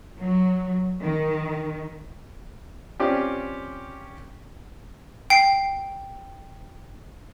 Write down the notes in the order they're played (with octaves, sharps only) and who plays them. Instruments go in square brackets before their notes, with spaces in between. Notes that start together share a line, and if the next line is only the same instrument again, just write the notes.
[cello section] F#3
D#3
[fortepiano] C4 C#4 F4 G4 C5 D5
[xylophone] G5 C7